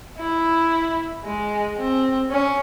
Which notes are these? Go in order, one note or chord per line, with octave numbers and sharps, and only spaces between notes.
E4
G#3
C4
C#4